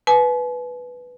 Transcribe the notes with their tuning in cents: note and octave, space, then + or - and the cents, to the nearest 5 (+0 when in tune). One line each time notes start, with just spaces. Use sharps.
B4 +0 G#5 +45